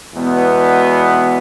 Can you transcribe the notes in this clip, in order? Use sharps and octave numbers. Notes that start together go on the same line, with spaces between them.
E2 B2 G#3 B3